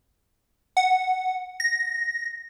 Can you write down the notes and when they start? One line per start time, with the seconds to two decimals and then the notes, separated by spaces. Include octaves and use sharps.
0.77 F#5
1.60 A#6